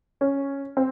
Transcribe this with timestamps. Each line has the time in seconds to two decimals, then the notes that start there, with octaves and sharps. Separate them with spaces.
0.21 C#4
0.77 C4